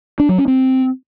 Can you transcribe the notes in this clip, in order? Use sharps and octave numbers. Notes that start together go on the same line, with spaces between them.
D4
F#3
C#4
C4